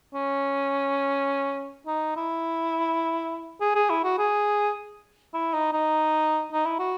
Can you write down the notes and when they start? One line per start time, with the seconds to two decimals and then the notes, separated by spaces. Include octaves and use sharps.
0.14 C#4
1.87 D#4
2.16 E4
3.61 G#4
3.75 G#4
3.90 E4
4.04 F#4
4.19 G#4
5.34 E4
5.54 D#4
5.73 D#4
6.53 D#4
6.66 E4
6.79 F#4